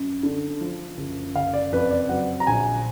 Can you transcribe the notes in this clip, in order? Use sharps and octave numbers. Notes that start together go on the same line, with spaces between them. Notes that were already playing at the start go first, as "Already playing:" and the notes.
Already playing: F#2
D3
F3
F#1
F#1 F5
D5
F2 B4
D5
F#3 F#5
A#5
A#1 G#5